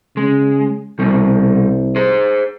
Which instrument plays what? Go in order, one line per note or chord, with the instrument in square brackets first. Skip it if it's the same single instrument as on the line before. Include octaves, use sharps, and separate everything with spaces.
[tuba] C#3 [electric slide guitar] G#3
[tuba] C2 [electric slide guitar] B2 G3
[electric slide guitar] G#4 C5